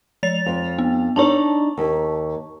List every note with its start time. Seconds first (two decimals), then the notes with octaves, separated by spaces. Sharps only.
0.23 F3 A6 F7
0.46 F2
0.78 B3
1.16 D4 D#4 C#5 A5 A#5 C#6
1.77 D#2